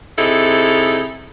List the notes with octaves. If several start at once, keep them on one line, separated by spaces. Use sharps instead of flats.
C3 D#4 E4 G#4 A4